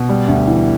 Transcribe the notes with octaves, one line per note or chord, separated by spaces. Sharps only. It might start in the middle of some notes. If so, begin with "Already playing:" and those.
Already playing: B2
G3
D2
E3